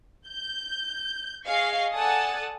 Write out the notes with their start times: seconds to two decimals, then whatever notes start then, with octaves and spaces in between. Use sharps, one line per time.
0.26 G6
1.47 G#4 D#5 F5 C#6 C7
1.93 A4 D5 F#5 G#5 A5 D#6